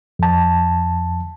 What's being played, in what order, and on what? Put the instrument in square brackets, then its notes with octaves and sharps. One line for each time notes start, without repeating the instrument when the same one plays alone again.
[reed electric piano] F2 A5